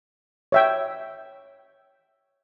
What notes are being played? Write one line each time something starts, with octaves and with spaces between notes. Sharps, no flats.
C#5 E5 G5